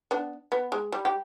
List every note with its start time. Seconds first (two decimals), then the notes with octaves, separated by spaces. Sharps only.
0.11 B3 D4
0.52 B3
0.72 G#3
0.92 G3
1.05 G4